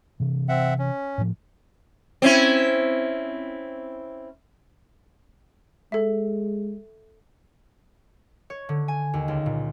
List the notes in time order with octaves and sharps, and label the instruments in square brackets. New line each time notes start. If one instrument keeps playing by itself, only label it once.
[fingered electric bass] C3 E3
[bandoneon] C4 E5 F#5
C#4
[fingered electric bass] A2 F3
[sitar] C4 C#4 E4
[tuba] G#3 [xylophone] A4 E5
[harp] C#5
D3
G#5
D#2
C#2
A#2